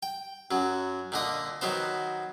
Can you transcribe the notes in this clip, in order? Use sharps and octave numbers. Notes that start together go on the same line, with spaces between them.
G5
F#2 F#3
A#2 D3 D#5
D#3 F#3 B3 C5